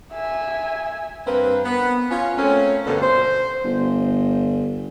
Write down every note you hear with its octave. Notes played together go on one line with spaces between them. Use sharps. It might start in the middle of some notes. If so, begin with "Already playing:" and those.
E5 G#5
G2 A#3 C4 B4
B3
C#4 F4
A3 A#3 C4 C#4
D2 G2 B2 D3 A#3 B3
C5
G1